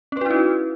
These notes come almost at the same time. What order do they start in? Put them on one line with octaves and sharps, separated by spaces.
C#4 B4 F#4 E4 D#4